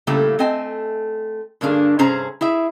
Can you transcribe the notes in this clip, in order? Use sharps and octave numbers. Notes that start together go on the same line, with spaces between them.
A2 C#3 F#3 G3 A3 A#3
A3 C4 D#5 G#5 A5
G2 D3 A#3 D4 G#4
G2 C3 C#4 G#4 C5 A#5
E4 G#4 E5